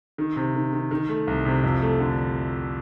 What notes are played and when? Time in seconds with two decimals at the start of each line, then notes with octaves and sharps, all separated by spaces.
0.18 D#3
0.36 C3
0.55 D#3
0.73 D#3
0.91 D#3
1.09 A3
1.27 C2
1.45 C3
1.64 F2
1.82 A3
2.00 D3